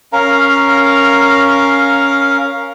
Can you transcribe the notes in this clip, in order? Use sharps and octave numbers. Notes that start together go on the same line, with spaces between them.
C#4 A#4 F5 A#5